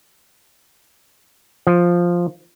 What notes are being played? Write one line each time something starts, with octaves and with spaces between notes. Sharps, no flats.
F3